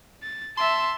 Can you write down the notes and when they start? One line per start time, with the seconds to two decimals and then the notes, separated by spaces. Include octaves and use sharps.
0.23 A6
0.58 E5 A5 C6